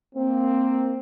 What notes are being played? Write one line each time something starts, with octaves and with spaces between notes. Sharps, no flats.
A#3 C4